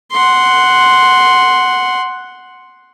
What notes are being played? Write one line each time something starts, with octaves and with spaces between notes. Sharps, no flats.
F#5 C6